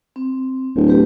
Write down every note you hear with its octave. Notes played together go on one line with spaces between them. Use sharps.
C4
D1
A3 G4 B4